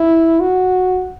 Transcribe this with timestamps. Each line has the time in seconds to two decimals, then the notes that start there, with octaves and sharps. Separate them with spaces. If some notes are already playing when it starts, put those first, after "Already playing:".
Already playing: E4
0.40 F#4